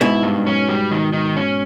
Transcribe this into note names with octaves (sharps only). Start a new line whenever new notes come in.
G#2 B2 E4
G2
C#4
G3
D#3
D#3
C#4